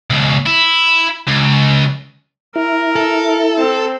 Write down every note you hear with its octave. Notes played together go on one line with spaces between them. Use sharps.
C#2 B2
E4
C#2
E4 A#4
A4
C4